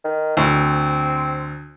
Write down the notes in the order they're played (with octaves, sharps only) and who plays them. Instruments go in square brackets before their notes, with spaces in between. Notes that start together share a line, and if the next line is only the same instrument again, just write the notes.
[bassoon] D#3
[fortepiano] D2 [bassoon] C4